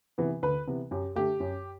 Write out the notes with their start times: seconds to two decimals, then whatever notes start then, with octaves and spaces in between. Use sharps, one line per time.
0.18 C3 E3 B3
0.43 D2 B4
0.67 C3 E3 B3
0.91 F#2 G4
1.16 D3 A3 G4
1.40 F#2